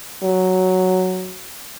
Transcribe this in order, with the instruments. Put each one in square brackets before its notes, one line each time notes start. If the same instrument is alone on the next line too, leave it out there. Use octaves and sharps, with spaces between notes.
[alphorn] F#3